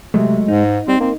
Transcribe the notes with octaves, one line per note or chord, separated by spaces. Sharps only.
C3 F#3 G#3 A3
G#2 D#4
G3 C4
A#3 C4